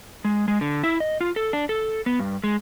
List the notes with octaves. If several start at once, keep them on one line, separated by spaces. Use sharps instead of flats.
G#3
G#3
D3
E4
D#5
F4
A4
D4
A4
B3
G2
G#3